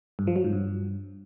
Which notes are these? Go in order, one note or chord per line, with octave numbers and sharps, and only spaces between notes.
G2
F3
F#3
G#2
G2